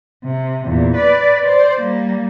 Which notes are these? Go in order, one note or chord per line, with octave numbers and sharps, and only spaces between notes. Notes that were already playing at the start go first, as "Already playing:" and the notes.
C3
E2 A#2
B4 D5
C5 D5
G3 A#3